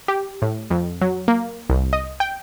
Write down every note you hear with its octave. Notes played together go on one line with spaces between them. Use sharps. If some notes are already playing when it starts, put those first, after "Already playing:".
G4
A2
F2
F#3
A#3
C2
D#5
G5